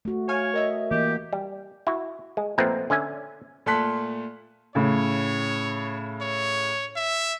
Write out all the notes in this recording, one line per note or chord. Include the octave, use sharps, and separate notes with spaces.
A3 F#4
C#5 F5 G#5 F6
A#4 D#5 E5
E3 A#3 G4
G3
E4 F#4
G#3
A#2 F3 A3 B3 C4
D3 C#4 E5 G#5
A#2 A3 A4 C6 F#6 B6
A2 C#3 C#5
C#5
E5